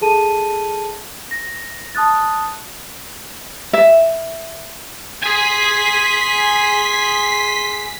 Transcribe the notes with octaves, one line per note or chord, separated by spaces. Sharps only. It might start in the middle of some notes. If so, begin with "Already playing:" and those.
G#4 A4 A5 D#7
A#6
A5 D#6 F#6 A6
E5
G#4 G#5 C6 B6